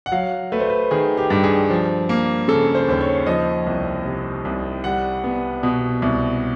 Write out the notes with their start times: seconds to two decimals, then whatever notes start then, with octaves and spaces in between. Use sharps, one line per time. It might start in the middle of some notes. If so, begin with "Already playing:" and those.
0.06 F#5
0.12 F#3 F5
0.52 A3 B4
0.60 C5
0.70 B4
0.91 D#3 G#4
1.17 G4
1.30 G2
1.44 G#4
1.70 F3
2.09 A#3
2.48 C#3 A4
2.75 C5
2.88 D#2 C5
3.01 C#5
3.26 F3 D#5
3.67 C2
4.05 C3
4.45 C2
4.84 G3 F#5
5.24 B3
5.63 B2
6.02 C2